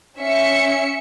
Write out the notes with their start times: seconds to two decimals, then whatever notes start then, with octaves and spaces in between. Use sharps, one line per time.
0.17 C#4 E5 C#7